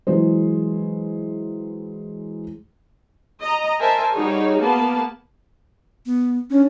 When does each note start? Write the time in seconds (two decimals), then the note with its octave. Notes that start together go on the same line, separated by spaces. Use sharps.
0.07 E3 F#3 G#3 G#4 C5
3.42 D#5 A#5
3.80 A#4 C5 E5 G#5 A5
4.13 G3 D#4 F#4 G#4 C#5
4.60 A#3 B3 A5
6.06 B3
6.50 C#4 D4